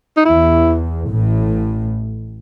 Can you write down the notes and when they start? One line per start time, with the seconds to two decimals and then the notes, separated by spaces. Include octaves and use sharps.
0.17 D#4
0.25 E2 E4
1.08 A1 A2